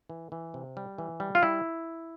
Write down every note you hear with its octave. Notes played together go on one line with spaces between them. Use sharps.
E3
E3
C3
G3
E3
G3
F4
G3 E4